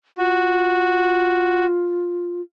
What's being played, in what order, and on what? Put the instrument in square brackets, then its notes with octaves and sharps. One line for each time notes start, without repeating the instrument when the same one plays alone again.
[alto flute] F4 [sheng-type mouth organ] F#4